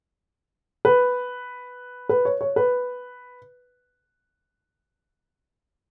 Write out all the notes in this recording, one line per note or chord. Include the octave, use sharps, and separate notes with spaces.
B4
B4
C#5
C#5
B4